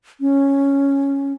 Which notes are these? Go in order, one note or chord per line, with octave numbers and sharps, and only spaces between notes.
C#4